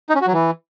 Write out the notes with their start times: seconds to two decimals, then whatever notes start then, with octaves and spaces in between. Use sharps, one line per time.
0.09 D#4
0.15 C#4
0.21 F#4
0.27 F#3
0.33 E3